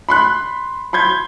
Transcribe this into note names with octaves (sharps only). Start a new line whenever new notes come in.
B5 C6 F#6
B5 C6 G6 G#6